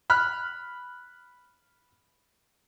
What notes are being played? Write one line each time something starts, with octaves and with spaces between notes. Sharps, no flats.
B5 F6 F#6